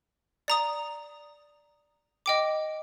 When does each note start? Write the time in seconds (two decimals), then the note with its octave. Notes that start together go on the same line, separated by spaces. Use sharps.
0.48 D5 A#5 D#6
2.26 D#5 G5 D6